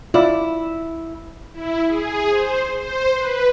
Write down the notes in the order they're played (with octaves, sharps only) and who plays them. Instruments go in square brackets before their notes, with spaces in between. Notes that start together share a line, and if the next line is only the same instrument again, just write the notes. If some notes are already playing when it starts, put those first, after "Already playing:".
[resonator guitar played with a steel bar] E4 [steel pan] F4 D5 B5
[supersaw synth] E4
G#4
C5
C5
B4